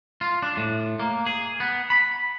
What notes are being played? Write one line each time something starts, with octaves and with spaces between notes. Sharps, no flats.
F4
D4
A2
A#3
G#4
B3
B5